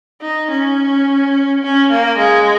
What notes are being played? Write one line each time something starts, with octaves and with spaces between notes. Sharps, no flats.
D#4
C#4
C#4
A#3
G#3